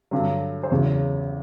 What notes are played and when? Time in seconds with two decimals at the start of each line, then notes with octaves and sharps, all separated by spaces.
0.11 G2 D3 F#3
0.63 C5
0.71 E2 C#3 F#3 C#5